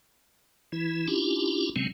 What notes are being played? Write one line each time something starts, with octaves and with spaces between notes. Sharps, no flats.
E3 E4
C#4 D4 E4 F4 G4
C3 F#3 G#3 C4 C#4